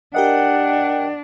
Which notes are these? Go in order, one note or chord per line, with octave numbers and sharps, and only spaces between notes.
D4 G4 A#4 D#5 F#5 G5